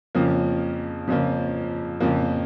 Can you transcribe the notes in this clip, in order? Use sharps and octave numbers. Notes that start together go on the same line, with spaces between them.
F2 C#3 F3 A#3
F2 C#3 F3 A#3
F2 C#3 F3 A#3